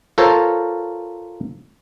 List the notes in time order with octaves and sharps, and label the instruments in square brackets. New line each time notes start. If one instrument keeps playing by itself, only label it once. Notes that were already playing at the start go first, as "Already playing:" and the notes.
[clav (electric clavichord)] F4 A4 A#4 C5 C#5